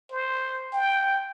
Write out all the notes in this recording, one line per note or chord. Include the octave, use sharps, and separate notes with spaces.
C5
G5